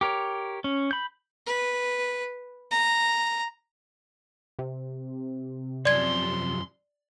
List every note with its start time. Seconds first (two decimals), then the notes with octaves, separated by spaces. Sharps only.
0.01 G4 A#4 C#5
0.64 C#4
0.91 B5 G6
1.47 B4
2.71 A#5
4.59 C3
5.85 F#2 F3 D5 C6 G#6